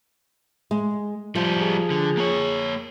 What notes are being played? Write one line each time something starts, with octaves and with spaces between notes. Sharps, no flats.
G#3
F3 G3 F4
G#4
D3
A#3 C#5